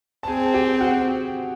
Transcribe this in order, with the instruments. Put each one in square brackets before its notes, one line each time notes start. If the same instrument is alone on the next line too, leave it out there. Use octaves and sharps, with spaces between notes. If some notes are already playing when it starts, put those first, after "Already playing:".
[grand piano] A5
[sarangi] C4 [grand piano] G#4 G#5
[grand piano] G4 G5
F#4 F#5